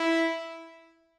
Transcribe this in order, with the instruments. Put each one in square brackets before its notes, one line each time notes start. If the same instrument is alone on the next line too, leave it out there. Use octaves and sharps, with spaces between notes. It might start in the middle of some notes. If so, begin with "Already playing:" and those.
Already playing: [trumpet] E4